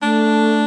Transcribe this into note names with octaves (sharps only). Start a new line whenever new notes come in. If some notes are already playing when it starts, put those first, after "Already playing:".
A3 D4